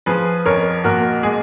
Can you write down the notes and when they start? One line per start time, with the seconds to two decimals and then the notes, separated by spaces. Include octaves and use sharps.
0.06 F3 G#4 B4
0.46 F2 A#4 C#5
0.84 A#2 F#4 A#4
1.23 G#3 G#4